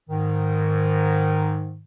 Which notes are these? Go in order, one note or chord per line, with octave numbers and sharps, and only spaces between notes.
G#2 D#3